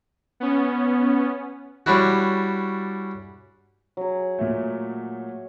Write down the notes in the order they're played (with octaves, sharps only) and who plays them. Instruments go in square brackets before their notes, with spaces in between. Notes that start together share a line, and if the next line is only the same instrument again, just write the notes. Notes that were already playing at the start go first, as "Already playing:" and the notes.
[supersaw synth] B3 C#4
[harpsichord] G3 C#4 D4 E4 F#4
[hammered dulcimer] F#3 G#4
[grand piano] A#2 A3